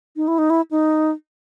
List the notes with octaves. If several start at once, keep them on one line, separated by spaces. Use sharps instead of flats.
D#4
E4
D#4
E4
D#4